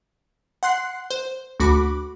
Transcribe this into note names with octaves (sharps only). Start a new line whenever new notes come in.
F#5 C6 F#6 C7
C5
D2 F#4 B5 D6